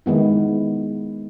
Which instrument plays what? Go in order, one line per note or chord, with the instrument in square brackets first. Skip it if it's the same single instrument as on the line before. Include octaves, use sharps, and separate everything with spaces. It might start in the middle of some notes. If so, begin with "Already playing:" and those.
[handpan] D#3 G#3 B3 E4